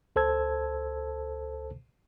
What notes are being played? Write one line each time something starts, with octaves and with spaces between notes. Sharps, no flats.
C#2 A4 C5 A5 E6 G#6